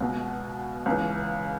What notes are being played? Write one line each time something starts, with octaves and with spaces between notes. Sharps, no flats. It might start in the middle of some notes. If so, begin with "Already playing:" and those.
C#2 B2
C#2 C#3 E3